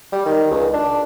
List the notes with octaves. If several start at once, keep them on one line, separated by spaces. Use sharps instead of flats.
G3
D#3
C#2
D4